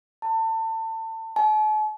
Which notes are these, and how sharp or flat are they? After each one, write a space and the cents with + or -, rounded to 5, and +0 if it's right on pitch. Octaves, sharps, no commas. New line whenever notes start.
A5 +30
A5 -45